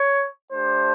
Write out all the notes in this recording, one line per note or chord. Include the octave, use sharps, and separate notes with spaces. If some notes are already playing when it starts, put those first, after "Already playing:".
Already playing: C#5
A3 D4 G4 C5